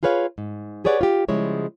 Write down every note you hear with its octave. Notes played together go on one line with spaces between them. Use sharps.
F4 G#4 B4 C#5 F5
G#2
G4 G#4 B4 C#5 D5 F#5
F4 G4
C#3 F3 G3 G#3 E4 C#5